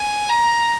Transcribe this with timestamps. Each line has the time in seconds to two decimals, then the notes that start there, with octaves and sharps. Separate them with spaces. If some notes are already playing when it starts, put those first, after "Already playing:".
Already playing: G#5
0.29 A#5